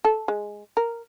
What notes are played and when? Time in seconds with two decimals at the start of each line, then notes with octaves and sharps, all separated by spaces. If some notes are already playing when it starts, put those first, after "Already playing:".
0.05 A4
0.28 G#3
0.77 A#4